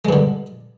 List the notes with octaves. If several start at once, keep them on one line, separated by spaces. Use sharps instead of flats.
G2 D3 G#3